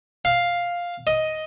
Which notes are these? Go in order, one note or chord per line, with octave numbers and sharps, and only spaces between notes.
F5
D#5